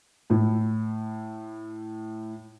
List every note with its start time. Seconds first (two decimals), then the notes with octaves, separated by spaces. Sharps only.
0.30 A2 E4